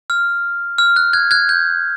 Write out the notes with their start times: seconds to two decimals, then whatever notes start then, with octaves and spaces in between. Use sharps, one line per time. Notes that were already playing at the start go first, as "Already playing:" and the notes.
0.10 F6
0.78 F6
0.96 F#6
1.13 F#6 G#6
1.31 F#6 G#6
1.49 G6